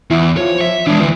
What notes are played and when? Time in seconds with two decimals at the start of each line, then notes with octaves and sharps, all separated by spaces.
0.10 E2 E4
0.37 F3 C#5
0.61 E5
0.87 E3 G#3 D4
1.00 D2 E3